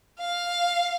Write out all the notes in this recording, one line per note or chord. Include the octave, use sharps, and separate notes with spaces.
F5